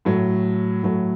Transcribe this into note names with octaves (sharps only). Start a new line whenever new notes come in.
A2 F#3 A3
A2 F#3 A3